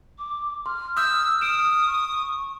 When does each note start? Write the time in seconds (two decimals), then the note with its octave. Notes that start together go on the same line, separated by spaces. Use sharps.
0.18 D6
0.66 C6 F6
0.97 D#6 E6 G6
1.41 D#6 D7 E7
1.86 C#6